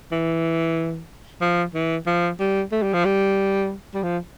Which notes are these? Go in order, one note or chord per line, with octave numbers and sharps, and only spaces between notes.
E3
F3
E3
F3
G3
A3
G3
F3
G3
G3
F3